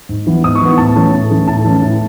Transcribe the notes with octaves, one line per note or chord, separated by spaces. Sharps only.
G#2
E3 B3
G#2 D#6
C#6
E3 B3
A2 A5
E3 A3 C#4
A2
E3 A3 C#4
A2 A5
E3 A3 C#4
A2